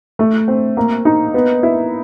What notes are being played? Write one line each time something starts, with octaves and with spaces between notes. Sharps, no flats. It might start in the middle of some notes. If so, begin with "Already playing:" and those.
A3
C4
A#3
D#4
B3
E4